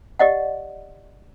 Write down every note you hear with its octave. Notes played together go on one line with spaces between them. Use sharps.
G4 D5 D#5 F#5